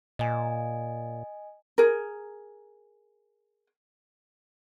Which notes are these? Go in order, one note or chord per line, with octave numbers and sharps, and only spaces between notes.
A#2 D#5 G#5
G#4 A#4